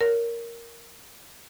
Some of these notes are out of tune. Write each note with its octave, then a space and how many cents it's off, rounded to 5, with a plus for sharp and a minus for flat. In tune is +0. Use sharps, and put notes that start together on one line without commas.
A#4 +0 C#5 +25